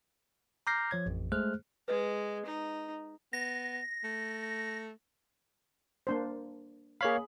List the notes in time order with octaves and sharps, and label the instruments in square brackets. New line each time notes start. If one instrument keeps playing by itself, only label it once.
[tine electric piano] A#5 D6 F6 G6 A#6 C7
F3 C#5 G#6
A1 F2
G#3 A3 G#4 C5 F6 F#6
[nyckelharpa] G#3 [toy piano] B4 D#5
[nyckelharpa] D#4
[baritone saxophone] B3 [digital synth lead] A#6
[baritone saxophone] A3
[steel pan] A#3 D4 C5
[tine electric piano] A#3 C#5 F5 [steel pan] G#4 B5